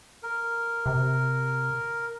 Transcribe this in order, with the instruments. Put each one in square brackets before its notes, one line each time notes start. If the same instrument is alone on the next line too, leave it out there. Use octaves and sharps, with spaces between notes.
[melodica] A#4
[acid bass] C3